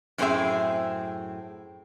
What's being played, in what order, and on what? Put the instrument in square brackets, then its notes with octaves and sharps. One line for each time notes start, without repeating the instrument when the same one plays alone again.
[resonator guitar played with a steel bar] F#2 A2 C4 D4 G#4 E5